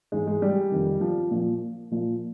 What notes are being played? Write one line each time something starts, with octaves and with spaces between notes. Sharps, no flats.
G#2 E3 G#3
G#3
G3
F2 C3 D#3
F3
A#2 F3
A#2 F3